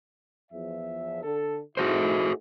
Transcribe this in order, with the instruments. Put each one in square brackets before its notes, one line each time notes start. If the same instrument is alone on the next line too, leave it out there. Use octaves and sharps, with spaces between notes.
[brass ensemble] E2 F3 E5
D3 A4
[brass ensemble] A3 D#4 E4 [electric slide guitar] F#4 G#4 C5